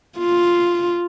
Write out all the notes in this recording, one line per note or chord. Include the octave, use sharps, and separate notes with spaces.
F4